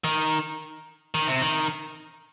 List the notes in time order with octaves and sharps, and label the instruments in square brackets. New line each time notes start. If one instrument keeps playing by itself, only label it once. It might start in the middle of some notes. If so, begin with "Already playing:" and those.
[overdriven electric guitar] D#3
D#3
C3
D#3